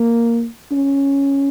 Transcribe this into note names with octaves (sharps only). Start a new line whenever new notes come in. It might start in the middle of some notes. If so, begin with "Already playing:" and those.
Already playing: A#3
C#4